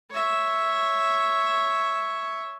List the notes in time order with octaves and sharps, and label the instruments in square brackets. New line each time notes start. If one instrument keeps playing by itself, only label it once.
[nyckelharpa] C#5 E5